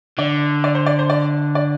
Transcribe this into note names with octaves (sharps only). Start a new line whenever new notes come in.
D3 D5
D5
C5
D5
C5
D5
D5